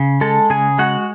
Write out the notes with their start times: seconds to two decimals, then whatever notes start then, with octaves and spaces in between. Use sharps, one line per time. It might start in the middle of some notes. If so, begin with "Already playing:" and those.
Already playing: C#3
0.21 G#3 A4 A5
0.50 C#3 G#4 G#5
0.78 G#3 F#4 F#5